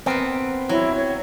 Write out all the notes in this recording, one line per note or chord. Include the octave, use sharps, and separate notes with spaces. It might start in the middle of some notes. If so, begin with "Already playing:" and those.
B3 C4 A#4 B4
F#3 E4
C#5